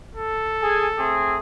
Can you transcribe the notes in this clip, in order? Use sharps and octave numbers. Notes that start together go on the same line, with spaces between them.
A4
G#4 G#5
A3 C4 G#4